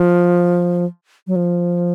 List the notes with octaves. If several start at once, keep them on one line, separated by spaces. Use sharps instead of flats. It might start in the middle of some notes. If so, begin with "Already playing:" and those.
Already playing: F3
F#3
F3